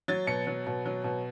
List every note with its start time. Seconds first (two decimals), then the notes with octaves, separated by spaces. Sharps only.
0.08 F#3 A6
0.27 B2 C#7
0.47 F#3
0.67 B2
0.86 F#3
1.04 B2